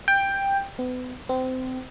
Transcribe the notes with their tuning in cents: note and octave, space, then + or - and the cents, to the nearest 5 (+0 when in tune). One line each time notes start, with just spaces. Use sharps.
G5 +10
B3 +35
C4 -25